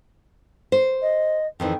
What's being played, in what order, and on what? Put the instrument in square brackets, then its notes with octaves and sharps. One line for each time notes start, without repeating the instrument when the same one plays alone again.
[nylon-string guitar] C5
[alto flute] D#5
[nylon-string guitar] F2 D#3 E3 [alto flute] G5